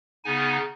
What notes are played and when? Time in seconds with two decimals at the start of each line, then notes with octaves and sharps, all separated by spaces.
0.24 C#3 B3 D#4 G#5